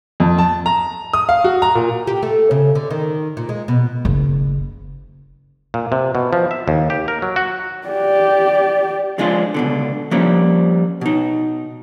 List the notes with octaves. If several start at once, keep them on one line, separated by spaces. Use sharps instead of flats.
F2
A5
A#5
D#6
F5
F#4
A#5
A#2
G4
A3
C#3
D3
D#3
A#2
G#3
B2
F#1
A#2
C3
B2
F3
E5
D#2
G4
A#4
F#3
F#4
G4 D5
F3 G#3 D4 F4
C#2 B2 D3
F3 G3 A#3 C#4
B2 D#4